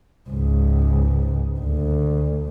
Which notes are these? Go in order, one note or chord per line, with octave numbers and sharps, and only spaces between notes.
C#2 G#2
D2